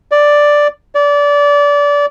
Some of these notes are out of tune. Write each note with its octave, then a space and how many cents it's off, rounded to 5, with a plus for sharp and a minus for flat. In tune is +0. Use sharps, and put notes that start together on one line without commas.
D5 +0
D5 -25